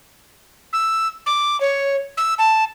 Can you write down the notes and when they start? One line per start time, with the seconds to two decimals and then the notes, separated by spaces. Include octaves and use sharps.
0.73 E6
1.26 D6
1.61 C#5
2.17 E6
2.38 A5